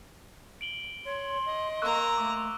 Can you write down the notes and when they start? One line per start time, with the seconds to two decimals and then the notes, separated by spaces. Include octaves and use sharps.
0.61 D7 F#7 G7
1.05 C#5 C6
1.46 D#5
1.82 A#3 A#5 C#6 E6 F#6
2.18 A3 D6